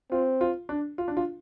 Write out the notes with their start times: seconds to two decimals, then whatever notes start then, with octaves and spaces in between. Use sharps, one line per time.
0.12 C4 F4
0.41 F4
0.69 D4
0.98 F4
1.08 D4
1.17 F4